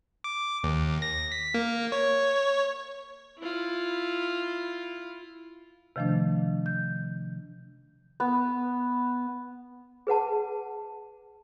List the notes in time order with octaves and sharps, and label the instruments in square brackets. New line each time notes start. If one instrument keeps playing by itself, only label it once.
[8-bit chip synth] D6
D#2
A#6
B6
A#3
C#5
[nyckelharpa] E4 F4
[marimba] C3 D#3 F3 A3 D4
G6
[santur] B3
[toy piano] G#4 B4 F#5 A5